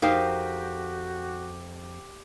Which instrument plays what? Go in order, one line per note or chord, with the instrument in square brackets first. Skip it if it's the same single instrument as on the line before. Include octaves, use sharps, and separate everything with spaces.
[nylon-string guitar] F2 F5 [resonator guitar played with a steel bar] D#4 A#4 C5 [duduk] F#4 [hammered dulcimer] G4